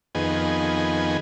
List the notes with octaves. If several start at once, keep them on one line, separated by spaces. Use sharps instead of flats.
F2 D#3 B3 G#4